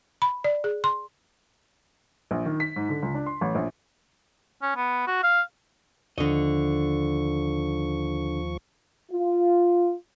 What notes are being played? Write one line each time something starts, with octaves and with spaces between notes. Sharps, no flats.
B5
D5
G#4
C6
A#1
D#3
B6
G#2
D3
C#2
D4
C6
A1
A#1
C#4
B3
F#4
F5
D#2 D3 F3 D#5 C#6
F4